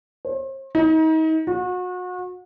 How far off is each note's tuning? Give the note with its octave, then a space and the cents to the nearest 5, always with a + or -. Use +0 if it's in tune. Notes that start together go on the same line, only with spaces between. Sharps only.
C5 +45
D#4 +35
F#4 -35